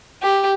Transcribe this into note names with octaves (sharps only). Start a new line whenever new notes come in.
G4